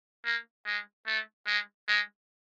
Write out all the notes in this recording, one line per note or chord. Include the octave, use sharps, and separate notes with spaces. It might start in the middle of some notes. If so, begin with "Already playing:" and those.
A#3
G#3
A3
G#3
G#3